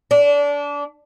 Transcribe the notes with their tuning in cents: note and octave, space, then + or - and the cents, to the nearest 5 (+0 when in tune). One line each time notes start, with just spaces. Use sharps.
D4 -25